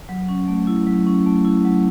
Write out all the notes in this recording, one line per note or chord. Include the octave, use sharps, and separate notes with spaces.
F#3
C#4
A3
E4
F#3
C#4
A3
E4
F#3